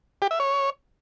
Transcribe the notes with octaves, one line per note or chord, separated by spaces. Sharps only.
G4
E5
C#5